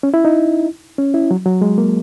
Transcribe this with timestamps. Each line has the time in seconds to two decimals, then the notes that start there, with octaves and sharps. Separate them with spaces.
0.03 C#4
0.14 E4
0.25 D#4
0.98 C#4
1.14 E4
1.31 F#3
1.46 F#3
1.61 G#3
1.78 A#3